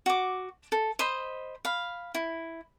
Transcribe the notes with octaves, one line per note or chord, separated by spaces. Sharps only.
F#4 D6
A4
C5 D#5 B5
F5 B5
E4